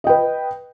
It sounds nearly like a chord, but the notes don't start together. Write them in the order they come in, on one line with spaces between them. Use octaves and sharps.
D#5 G5 B4